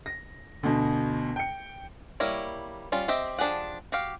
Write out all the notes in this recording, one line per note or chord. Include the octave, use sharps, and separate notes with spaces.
A#6
D2 B2
G5 C#7
G3 A#3 E4 A#4 C#5
G3 C#4 F4
C4 G4 D#5 E5
F3 D4 G4 G#4 F#5
F#4 G4 F5